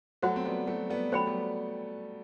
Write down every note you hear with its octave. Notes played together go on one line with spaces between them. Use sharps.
F#3 A3 F#4 C5 F#5
C4
G3 B3
F#3 A3
G3 B3
F#3 A3 C5 G5 B5
G3 B3